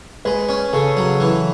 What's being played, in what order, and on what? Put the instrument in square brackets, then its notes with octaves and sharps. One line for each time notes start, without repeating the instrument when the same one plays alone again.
[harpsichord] G#3 [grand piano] B4
[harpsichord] C#4
[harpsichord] C#3 [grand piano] A4
[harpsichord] F#3
E3